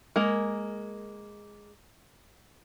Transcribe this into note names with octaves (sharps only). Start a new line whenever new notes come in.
G#3 A#3 A#4